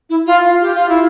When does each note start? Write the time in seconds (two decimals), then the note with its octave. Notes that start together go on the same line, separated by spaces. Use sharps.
0.10 E4
0.27 F4
0.61 G4
0.75 F4
0.89 E4